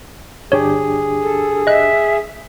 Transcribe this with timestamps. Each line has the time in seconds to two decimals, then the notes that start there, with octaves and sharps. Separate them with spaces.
0.52 G1 D4 G4 G#4 C#5
1.22 A4
1.67 D#5 E5 F#6